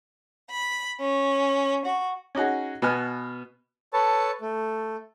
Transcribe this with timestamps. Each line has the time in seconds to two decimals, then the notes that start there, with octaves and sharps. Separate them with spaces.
0.50 B5
1.00 C#4
1.86 F#4
2.35 C#4 D#4 F#4 G#4
2.82 B2 B3 G#5 F6
3.93 A4 B4 C#5 A5
4.41 A3